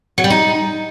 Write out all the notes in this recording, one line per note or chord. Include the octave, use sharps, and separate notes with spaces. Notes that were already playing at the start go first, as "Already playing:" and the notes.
F#3
G3
D#4